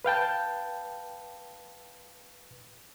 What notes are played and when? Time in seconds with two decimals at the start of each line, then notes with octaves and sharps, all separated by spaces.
0.05 B4 F5 G5 A5